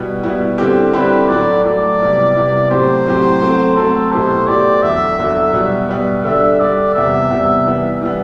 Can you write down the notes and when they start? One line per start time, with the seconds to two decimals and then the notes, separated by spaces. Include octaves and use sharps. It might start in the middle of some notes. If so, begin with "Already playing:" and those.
Already playing: B2 G3 B3 E4
0.23 B2 G3 B3 E4
0.58 D3 G3 C4 E4 G4
0.93 D3 G3 C4 E4 G4 B4
1.28 A2 F#3 A3 E4 D5
1.64 A2 F#3 A3 E4 D5
2.00 C3 G3 B3 E4
2.35 C3 G3 B3 E4
2.70 A2 F#3 C4 G4 C5
3.06 A2 F#3 C4 G4
3.41 F#3 A3 C4
3.76 F#3 A3 C4 A4
4.12 B2 A3 E4 G4 C5
4.48 B2 A3 E4 G4 D5
4.82 E2 D3 F#3 E5
5.19 E2 D3 F#3
5.53 B2 G3 B3
5.89 B2 G3 B3
6.24 D3 G3 D4 E5
6.60 D3 G3 D4 D5
6.94 E2 C3 G3 B3 E5
7.30 E2 C3 G3 B3
7.66 E3 G3 B3
8.01 E3 G3 B3